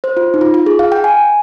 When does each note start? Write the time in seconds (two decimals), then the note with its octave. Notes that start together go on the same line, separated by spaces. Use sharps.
0.04 C5
0.17 F4
0.34 D#4
0.41 F4
0.54 F4
0.66 G#4
0.79 F5
0.92 G5
1.04 G#5